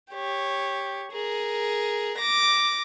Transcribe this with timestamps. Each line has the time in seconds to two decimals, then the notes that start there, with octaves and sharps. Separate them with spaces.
0.12 G4 C#5
1.12 G#4 A#4
2.18 D6 A#6